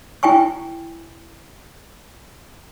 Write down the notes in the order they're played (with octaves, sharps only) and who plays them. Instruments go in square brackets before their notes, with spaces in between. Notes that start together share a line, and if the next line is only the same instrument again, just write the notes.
[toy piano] E4 G5 G#5 C#6